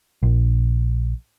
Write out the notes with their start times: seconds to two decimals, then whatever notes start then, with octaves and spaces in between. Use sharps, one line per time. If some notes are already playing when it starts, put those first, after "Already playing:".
0.23 A#1